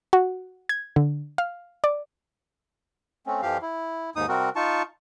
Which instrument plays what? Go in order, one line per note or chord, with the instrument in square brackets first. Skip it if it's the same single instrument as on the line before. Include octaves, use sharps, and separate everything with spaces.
[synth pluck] F#4
G#6
D3
F5
D5
[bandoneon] A3 C4 C#4
F2 E3 F3 G4 F5
E4
D#2 G#2 D#4 D#6
C3 G3 C4 F#4 A#4
D#4 F4 A5 C#6